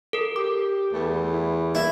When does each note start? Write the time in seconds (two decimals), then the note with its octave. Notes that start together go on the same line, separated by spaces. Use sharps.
0.13 A4 A#4
0.36 G4 D6
0.93 E2 A3
1.33 E4
1.75 A#3 E4